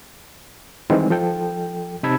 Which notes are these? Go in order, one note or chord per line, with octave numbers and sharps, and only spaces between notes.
D#3 E3 G3 G#3 C4 D#4
F3 A4 G5
C3 D#4 A5 B5 E6 G#6